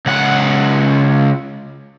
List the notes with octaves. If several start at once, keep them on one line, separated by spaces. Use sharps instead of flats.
C#2 F#5